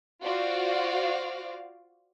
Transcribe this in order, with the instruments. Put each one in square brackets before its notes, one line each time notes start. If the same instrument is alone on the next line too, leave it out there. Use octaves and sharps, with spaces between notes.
[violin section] F4 F#4 C5 D5 F5